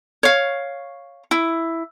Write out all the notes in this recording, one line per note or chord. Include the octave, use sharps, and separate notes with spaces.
C#5 F5
E4